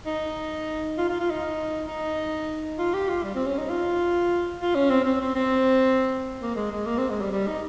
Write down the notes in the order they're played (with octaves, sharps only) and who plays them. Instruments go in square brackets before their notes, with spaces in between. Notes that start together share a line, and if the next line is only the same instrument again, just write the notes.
[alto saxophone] D#4
F4
F4
F4
D#4
D#4
F4
G4
F4
G3
C4
C#4
D#4
F4
F4
C#4
C4
C4
C4
C4
A#3
G#3
G#3
A#3
C4
G#3
G3
G3
D#4